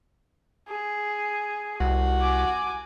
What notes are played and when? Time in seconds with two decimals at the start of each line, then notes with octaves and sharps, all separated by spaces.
0.69 G#4
1.80 C2 F#4
2.21 G#5 D6